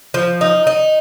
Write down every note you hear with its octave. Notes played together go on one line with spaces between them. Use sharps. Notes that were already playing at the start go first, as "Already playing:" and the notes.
F3
D#4
D#4